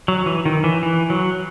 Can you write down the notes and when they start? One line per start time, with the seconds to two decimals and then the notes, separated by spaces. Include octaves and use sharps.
0.08 F#3
0.26 E3
0.45 D#3
0.64 E3
0.83 E3
1.10 F#3